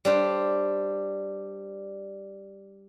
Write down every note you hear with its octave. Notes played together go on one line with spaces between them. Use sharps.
G3 D4 C5